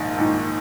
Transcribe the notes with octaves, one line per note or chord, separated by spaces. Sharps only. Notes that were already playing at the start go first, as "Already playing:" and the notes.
Already playing: A#1 G#2 D#3
A#1 G#2 D#3